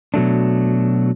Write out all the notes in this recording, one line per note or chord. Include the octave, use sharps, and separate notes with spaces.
B2 F#3 A3 D4